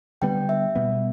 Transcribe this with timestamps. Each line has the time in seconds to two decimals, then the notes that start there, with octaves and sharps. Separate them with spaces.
0.22 D3 G3 B3 G5
0.49 E5
0.75 B2 G3 B3